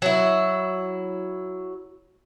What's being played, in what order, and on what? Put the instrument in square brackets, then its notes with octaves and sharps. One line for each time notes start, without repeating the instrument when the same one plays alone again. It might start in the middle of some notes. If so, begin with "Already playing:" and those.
[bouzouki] F#3 E4